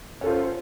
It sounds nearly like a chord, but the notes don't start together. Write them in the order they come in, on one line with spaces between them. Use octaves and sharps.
C#4 A4 F4 C5